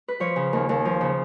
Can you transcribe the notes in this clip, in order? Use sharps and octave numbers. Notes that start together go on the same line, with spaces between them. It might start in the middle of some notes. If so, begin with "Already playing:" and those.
B4
F3 C#5
C#3
D#2
D#2
F3
C#3